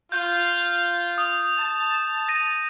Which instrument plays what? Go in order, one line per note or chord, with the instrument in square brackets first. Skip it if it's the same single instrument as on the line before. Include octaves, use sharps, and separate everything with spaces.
[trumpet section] F4 [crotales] G6
[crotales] D#6
[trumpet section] A5
[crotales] A#6 D#7